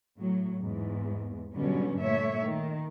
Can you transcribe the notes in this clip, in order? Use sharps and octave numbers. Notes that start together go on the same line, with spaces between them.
A2 F#3
E2 G#2
G2 B2 D3 F#3 G3 C#4
A#2 A3 C#5 E5
D#3